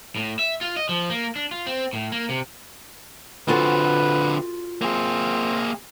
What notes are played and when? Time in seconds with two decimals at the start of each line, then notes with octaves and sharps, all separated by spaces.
0.16 A2
0.39 E5
0.61 F4
0.77 D#5
0.89 F3
1.10 A#3
1.36 D4
1.51 F4
1.67 C4
1.93 A2
2.12 A#3
2.29 C3
3.48 D3 C4 F4 F#4 A4 B4
4.82 A#3 C4 G#4